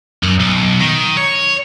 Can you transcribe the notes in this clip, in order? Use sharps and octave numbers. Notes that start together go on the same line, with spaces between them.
F#2
B1
D#3
C#5